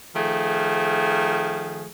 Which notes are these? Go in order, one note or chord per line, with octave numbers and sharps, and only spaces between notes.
D#3 F3 A3 G#4